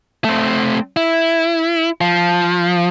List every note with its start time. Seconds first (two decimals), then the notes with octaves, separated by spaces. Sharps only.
0.25 A3 C4
0.97 E4
2.01 F3